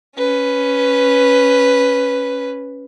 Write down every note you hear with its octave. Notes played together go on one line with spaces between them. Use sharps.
C#4 B4